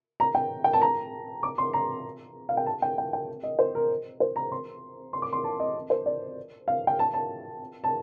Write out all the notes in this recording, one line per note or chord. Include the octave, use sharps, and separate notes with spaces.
A#5
G5
G5
A5
A#5
D6
C6
A#5
F5
G5
A5
G5
G5
G5
D#5
C5
A#4
C5
A#5
C6
C6
D6
C6
A5
D#5
C5
D5
F5
G5
A5
A5
A5